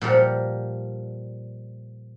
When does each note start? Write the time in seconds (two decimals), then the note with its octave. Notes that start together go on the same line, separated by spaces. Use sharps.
0.01 A#2 F3 G3 A#4 F#5